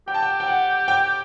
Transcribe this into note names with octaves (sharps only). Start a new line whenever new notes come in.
G4 G5
A5
G5
G5
F#5
G5